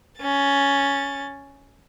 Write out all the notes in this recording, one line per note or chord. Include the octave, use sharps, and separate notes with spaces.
C#4 A6